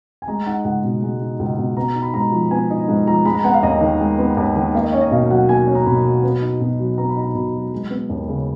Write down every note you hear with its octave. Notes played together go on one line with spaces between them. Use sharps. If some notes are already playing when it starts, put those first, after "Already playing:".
G#5
G#3 A#5
D#4 F#5
C#2 F#5
B2
G#3
D#4
C#2
B2
B3 A#5
D#4
B5
G#2 A#5
F3
B3 G#5
D#4
G#2
F3 A#5
G#3 B5
A#5
B3 F#5
F5
D#2 D#5
D#3
G#3
B3
D#2
D#3
A#3 F5
D#5
C#4 C#5
D#5
B2 F5
F#3 F#5
A#3 G#5
C#4
A#5
B2 B5
F#3
B3
D#4
B2
F#3
B3 A#5
B5
D#4 A#5
B2 B5
F#3
G#3
B3
D#2
C#3